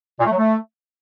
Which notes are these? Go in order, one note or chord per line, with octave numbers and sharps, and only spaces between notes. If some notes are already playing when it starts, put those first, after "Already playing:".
A#2
A3
F#3
A3